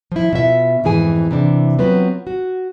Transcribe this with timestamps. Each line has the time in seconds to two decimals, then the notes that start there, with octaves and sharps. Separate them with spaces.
0.12 F3 E4
0.33 B2 F4 E5
0.84 F2 G#2 E3 G#4 G#5
1.31 C3 E3 D4
1.79 F#3 B3 C4 F4 B4
2.27 F#4